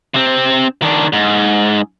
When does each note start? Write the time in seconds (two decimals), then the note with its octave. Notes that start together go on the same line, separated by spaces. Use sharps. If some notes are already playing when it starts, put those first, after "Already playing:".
0.14 C3 C4
0.82 D#3 D4
1.13 G#2